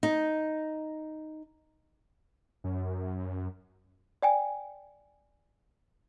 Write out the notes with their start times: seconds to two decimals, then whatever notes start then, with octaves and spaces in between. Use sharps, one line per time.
0.03 D#4
2.64 F#2
4.22 D5 G5 G#5